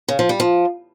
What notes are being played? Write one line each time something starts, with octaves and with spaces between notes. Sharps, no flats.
C#3
F3
G3
F3